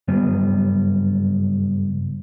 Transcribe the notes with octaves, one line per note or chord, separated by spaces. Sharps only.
F#1 G2 G3 B3